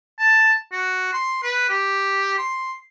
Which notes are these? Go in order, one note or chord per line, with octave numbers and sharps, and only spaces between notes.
A5
F#4
C6
B4
G4
C6